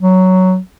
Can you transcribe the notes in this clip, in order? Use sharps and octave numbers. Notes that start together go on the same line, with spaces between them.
F#3